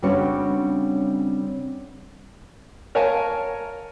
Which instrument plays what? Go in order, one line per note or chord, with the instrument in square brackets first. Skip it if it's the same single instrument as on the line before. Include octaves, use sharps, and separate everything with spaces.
[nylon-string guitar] C#3 G3 C4 D4 F#4 C#5
[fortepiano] A#4 C#5 F5 G#5 A5